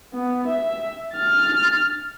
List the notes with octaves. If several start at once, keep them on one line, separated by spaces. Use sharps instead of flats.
B3
E5
F6 A6